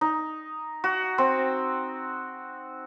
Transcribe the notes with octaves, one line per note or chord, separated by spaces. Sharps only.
D#4
F#4
C4